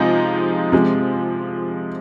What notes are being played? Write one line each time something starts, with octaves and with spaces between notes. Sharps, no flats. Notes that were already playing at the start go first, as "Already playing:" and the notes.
Already playing: C3 F3 G#3 D#4
C3 F3 G#3